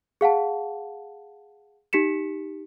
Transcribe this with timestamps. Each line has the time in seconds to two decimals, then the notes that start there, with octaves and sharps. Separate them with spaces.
0.21 G#4 F5 F#5 A5
1.93 D#4 G4 B6 C#7 E7